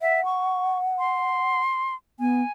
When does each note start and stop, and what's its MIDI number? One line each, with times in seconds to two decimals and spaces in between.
0.01 0.23 76
0.01 1.61 78
0.25 0.78 85
0.99 1.95 84
2.20 2.42 59
2.20 2.52 80